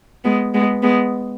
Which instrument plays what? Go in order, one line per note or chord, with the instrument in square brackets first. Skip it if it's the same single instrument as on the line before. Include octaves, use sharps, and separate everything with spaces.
[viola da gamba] G#3 B3
G#3 B3
G#3 B3